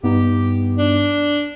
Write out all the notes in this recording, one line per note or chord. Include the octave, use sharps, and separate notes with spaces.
G2 B3 D#4 G4
D4